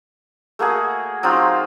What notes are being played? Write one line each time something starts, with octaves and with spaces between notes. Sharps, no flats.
A3 A#3 F#4 G#4
F#3 C4 D#4 F4